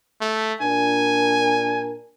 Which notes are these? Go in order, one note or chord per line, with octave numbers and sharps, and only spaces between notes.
A3
A#2 D4 A#4 G#5